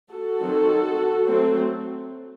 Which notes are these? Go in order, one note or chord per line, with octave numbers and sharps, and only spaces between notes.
F#4 A4
D#3 F#3 C4
F#3 A3 C4